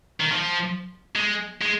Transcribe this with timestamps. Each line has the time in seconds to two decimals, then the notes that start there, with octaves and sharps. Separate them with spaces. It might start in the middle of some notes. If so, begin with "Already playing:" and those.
0.20 D#3
0.31 F3
1.16 G#3
1.61 G#3